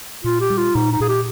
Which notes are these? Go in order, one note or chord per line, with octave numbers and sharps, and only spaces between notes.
A#2 F4
G4
G3
F4
A#2 D#4
D#4
A#2 G#4
G4